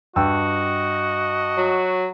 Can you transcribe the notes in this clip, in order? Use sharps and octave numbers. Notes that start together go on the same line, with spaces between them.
G2 F#4 D#5 G5 E6
F#3